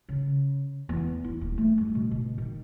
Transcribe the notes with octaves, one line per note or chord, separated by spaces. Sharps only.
C#3
E2
E4
D#1
A3
G2
B2
B2
D#3